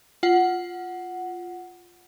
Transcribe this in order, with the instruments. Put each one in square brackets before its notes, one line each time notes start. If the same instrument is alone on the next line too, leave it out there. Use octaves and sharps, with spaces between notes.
[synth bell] F4 F#5